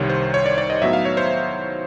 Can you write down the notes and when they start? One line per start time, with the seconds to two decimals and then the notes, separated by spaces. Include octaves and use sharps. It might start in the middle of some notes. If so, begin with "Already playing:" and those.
Already playing: C2 C3 D#3 G3 C#5
0.10 C5
0.34 C#5
0.46 D5
0.58 D5
0.70 D#5
0.82 A2 F#3 B3 D#4 E5
0.93 F5
1.05 C#5
1.17 C5